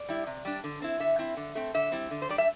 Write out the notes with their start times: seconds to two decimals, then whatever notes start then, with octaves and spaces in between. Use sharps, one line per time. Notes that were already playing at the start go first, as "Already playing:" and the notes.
Already playing: D5
0.09 G3 E4
0.27 C3
0.45 G3 D4
0.64 D3
0.82 C4 E4
1.00 D3 E5
1.19 C4 E4
1.37 D3
1.55 A3 C4
1.74 D3 E5
1.92 G3 C4 E4
2.11 D3
2.22 C5
2.29 G3 D4 D5
2.38 E5